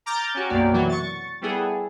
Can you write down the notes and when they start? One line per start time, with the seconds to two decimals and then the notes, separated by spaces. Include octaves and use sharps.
0.06 A#5 D6 F6 G6 A6
0.34 C#4 F#4 G4
0.49 B1 F#2 B2 A#3 G4 D5
0.71 C3 E3 F#3 F#4
0.89 C#6 A6
1.42 G3 B3 E4 G#4 A4